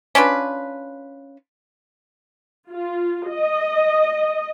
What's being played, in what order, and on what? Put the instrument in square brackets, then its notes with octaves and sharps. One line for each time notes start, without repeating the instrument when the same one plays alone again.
[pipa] C#4 D4 F4 B4
[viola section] F4
D#5